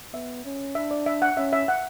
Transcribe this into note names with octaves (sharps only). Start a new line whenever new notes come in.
B3 E5
C#4
D4 E5
D5
E5
F#5
C#4 E5
E5
F#5